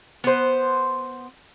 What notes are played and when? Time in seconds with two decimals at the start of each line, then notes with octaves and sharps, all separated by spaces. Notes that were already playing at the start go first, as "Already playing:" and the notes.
0.24 B3 C5